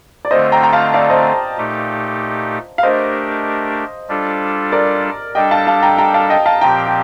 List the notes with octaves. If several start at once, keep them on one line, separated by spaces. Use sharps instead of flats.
D5
D3 A3 C4 F4 C5 D#5
G5 A#5
A#5
F5 A5
D5 F5
C5 D#5
A#2 A3 D#4 G4
F5
A3 D4 G4 A#4 C5 D#5
G3 D4 F4 A4
A#4 D5
G3 D4 A4 D#5 G5
F5 A5
F5 A5
G5 A#5
G5 A#5
F5 A5
D#5 G5
F5 A5
A#2 F3 C4 G4 G5 A#5
G5